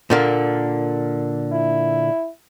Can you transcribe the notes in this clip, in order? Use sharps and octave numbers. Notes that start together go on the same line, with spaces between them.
A#2 D3 A#3
E4